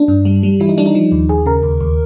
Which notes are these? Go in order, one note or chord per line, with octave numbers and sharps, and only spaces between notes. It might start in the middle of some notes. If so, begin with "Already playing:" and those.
Already playing: D4
G2
G3
G3
E3 E4
D#4
G3 D4
D#4
F3
D#2
D#2 G#4
C#3 A#4
D#2
D#2